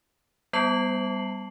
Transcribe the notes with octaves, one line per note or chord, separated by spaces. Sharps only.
G3 B3 A5 C7 F#7